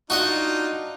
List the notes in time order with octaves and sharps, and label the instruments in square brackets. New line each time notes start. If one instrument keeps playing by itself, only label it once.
[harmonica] D4 D#4 F4 [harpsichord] F#4 D#5 F#5